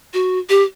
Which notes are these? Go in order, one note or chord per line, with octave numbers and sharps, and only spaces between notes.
F#4
G4